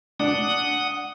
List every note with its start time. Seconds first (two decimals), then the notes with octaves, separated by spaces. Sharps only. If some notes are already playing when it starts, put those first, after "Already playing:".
0.20 D4 F#5 D#6